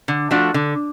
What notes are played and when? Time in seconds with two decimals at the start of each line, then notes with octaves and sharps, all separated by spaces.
0.08 D3
0.31 F3 A3 D4 F#4
0.54 D3